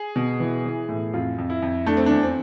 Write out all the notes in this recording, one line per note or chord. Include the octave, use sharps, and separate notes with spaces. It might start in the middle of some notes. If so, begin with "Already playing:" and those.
Already playing: G#4
B2
E3
E3
A2
F2 F4
F2
E4
F2
A3 D4
C4
E2 D4
C4